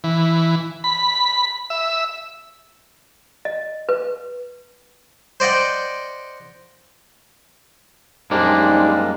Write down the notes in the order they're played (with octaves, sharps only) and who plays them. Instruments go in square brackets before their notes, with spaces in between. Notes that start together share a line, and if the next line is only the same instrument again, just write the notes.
[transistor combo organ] E3
B5
E5
[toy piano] D#5
B4
[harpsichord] C5 D5 D#5 F#5 G5
[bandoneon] F#2 G3 G#3 [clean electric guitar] A#3 D4 [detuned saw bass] D#4 [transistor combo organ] G4 C5